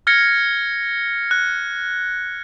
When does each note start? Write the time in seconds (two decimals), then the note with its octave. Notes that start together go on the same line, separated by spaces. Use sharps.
0.07 F6 G#6 A#6 C#7
1.31 F#6